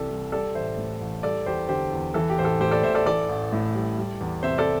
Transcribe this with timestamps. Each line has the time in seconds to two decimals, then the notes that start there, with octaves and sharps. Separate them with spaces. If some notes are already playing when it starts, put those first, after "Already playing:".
Already playing: C2 C3 E3 G4 A4 D5
0.10 G3
0.32 G3 A4 D5
0.55 A1 C5 E5
0.77 A2
1.01 A1
1.23 G3 A4 D5
1.46 E2 G4 C5
1.69 D3 G4 C5
1.92 E2
2.14 E3 A4
2.30 G4
2.37 A1 C5
2.45 A4
2.60 A2 G4 C5
2.71 A4 D5
2.83 A1 C5 E5
2.95 A4 D5
3.06 E3 A4 D5
3.29 A1
3.52 A2
3.74 G3
3.98 G3
4.21 E2
4.43 C3 C5 E5
4.58 A4 D5